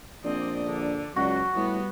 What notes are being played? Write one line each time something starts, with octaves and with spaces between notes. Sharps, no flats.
A#1 C4 D5 D#5
D3
C#2 F#3 F#4
A2 G3 B3